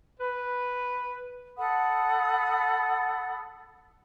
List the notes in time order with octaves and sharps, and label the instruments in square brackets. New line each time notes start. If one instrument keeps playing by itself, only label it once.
[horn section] B4
[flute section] A4 F#5 B5 D#6